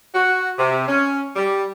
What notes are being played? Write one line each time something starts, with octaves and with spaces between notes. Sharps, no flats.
F#4
C3
C#4
G3